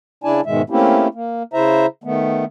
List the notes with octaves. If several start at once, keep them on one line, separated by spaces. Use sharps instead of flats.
C#3 D4 E4 D5 G#5 A5
G#2 B2 D#3 G#3 E5
A3 A#3 C4 C#4 E4 G4
A#3
C#3 E4 C5 E5 A#5
D#3 A3 B3